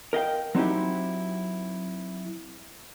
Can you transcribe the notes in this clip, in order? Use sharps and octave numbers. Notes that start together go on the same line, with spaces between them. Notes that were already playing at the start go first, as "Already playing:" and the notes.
A#4 D#5 F5 G5
F#3 C4 D#4 E4 G4